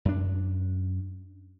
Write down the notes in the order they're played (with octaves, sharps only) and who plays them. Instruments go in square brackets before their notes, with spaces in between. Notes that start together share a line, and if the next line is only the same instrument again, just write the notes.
[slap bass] F#2 D4